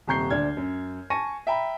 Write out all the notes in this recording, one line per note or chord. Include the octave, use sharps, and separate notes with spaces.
D#1 C3 A#5 C#6 G6 C7
D2 D4 F6 G#6
F#2
G#5 A5 C#6 A#6 D#7
E5 G5 A#5 B5